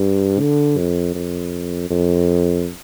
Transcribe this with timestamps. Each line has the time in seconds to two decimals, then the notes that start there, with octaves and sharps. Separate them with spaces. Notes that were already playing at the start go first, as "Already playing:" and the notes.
Already playing: G2
0.40 D3
0.78 F2
1.15 F2
1.90 F2